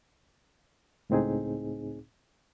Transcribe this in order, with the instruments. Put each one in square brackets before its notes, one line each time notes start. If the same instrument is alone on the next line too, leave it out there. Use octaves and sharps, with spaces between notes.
[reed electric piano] C#2 A2 C4 D#4 G#4